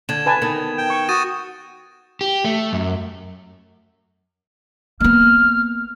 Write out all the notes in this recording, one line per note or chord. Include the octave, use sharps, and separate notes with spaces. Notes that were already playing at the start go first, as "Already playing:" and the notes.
D3 G#6 E7
B4 G#5 A5
D#3 B3
G5
C#6
F#4 D#6 A6 D#7
G4
A3
F#2
A#3 B3 F6